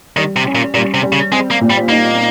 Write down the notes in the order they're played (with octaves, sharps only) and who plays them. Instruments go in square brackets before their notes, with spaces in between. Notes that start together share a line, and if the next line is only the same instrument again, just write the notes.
[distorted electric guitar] D#3 [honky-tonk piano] G3
[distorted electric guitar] C3
[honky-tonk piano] C#4
[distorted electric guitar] A#2
[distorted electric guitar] A#2 [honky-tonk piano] G3
[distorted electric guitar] C3
[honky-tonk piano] G3
[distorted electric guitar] C#3
[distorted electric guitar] G#3 [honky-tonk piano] C4
[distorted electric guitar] A#3
[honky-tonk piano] A#2
[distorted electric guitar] G3
[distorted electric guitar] A#3 [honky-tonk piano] D#4